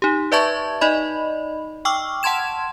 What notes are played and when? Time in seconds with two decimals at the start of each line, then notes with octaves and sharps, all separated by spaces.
0.02 D#4 G4
0.32 B4 D5 E5 A5 C#6 G#6
0.81 D#4 D5 D#5 B5
1.85 G5 C#6 D6 E6 F6
2.23 F#5 A5 C6 G#6 E7